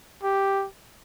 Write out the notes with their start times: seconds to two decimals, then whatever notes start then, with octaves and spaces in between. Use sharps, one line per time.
0.23 G4